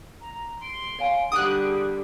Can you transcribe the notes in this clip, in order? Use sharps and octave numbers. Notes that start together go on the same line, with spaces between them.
A#5
C6 D7
C#5 F5 G#5
D3 G3 D#4 G4 F#5 D#6 F#6
G#4